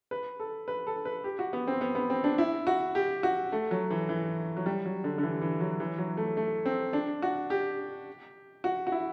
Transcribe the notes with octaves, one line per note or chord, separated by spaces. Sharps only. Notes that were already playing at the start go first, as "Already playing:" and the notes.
B4
A4
B4
A4
B4
G4
F#4
B3
C4
B3
B3
C4
D4
E4
F#4
G4
F#4
A3
F#3
E3
E3
F#3
G3
F#3
D3
D3
E3
E3
F#3
E3
F#3
A3
A3
C4
D4
F#4
G4
F#4
F#4
E4